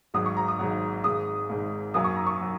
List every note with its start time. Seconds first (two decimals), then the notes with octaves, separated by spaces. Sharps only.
0.14 G#1 G#2 F#3 D#6
0.26 C#6
0.37 A#5
0.48 D#6
0.59 G#1 G#2 F#3
1.04 G#1 G#2 G#3 D#6
1.50 G#1 G#2 G#3
1.94 F#2 F#3 A#3 D#6
2.04 C#6
2.16 A#5
2.27 C#6
2.41 F#3